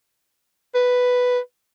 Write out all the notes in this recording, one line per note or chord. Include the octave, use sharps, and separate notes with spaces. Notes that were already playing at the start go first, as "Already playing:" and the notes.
B4